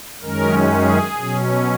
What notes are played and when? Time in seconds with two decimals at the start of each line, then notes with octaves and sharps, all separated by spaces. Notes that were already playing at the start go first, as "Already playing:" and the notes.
0.22 F#2 D#3 G#3 C#4 A#4
0.70 G#4
1.17 B2 F#3 C#4